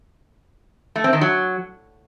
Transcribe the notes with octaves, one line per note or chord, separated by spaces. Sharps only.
A3
C4
D#3
F#3